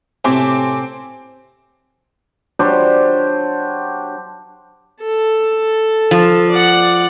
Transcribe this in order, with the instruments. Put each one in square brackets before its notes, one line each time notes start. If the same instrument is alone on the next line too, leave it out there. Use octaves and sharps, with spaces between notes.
[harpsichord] A2 C3 A3 [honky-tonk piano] C4 [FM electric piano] G#5 D6
[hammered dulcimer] F#3 D4 G4 C5
[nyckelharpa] A4
[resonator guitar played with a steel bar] F3
[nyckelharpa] D5 F#5